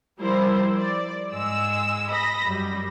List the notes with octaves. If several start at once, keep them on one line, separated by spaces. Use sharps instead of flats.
F3 G3 E4 A#4 C5
D5
G#2 G#3 E6
D#5 B5 A#6
F#2 G3